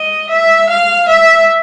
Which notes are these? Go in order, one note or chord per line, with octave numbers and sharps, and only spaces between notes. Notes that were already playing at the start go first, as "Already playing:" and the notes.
Already playing: D#5
E5
F5
E5